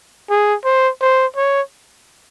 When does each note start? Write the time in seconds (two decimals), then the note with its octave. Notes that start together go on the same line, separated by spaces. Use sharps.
0.30 G#4
0.64 C5
1.01 C5
1.36 C#5